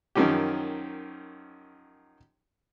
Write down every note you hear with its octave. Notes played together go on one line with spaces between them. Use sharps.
F#2 D#3 F3 C#4 G4